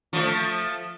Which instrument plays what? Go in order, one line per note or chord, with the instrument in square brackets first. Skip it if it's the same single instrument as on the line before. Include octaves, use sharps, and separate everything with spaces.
[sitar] F3 A3